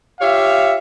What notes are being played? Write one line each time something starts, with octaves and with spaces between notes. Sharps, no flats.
F4 G4 C#5 E5 F5